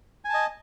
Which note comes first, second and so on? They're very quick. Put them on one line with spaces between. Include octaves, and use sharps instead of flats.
G#5 A5 D#5